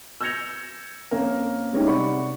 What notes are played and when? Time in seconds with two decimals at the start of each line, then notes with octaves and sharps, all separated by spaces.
0.21 E6 G6 G#6 A#6 C#7 F7
1.11 F2 A#3 C#4 A#4
1.73 G3 G#3 C#4 D#4 E4 G4
1.86 C3 D5 F#5 B5 C#6